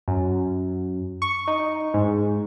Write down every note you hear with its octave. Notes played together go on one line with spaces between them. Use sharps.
F#2
C#6
D#4
G#2